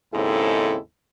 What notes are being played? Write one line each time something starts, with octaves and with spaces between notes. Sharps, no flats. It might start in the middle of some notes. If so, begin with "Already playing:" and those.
D#2 G#2 C#3 C4 E4 A4